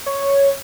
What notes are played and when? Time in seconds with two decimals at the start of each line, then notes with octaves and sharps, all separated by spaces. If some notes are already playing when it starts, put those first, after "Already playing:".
0.06 C#5